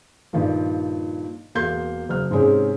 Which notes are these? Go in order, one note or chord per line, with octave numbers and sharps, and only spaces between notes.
G2 A#2 D#3 F3
E1 A#3 C6 G6
F#1 F6
G#2 C3 G#3 C#4